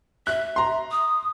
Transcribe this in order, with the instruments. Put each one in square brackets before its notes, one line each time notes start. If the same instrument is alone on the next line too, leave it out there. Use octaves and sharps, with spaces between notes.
[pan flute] E5 [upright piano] F#6
[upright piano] A#5 C6
[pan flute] D#6